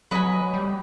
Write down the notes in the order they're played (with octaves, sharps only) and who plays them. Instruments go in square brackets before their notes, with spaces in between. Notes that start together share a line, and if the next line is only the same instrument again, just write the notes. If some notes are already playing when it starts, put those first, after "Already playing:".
[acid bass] F#3 [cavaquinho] B4 D#5 G#5 B5
[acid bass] G3